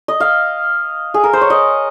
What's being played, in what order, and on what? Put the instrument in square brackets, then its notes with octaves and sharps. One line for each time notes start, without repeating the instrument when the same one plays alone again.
[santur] D#5
F5
G#4
A#4
C5
C#5
D#5